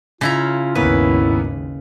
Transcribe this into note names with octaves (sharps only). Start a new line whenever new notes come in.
C#3 E4 F4 A#5
G#1 D#2 G#2 A#3 B3 C#4 E4 B4